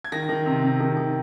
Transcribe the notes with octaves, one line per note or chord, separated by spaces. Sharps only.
G#6
D#3 A#6
D#3
C3
C3
D#3
D#3